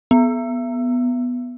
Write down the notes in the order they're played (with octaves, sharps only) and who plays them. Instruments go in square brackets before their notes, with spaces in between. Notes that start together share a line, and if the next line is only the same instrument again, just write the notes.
[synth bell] B3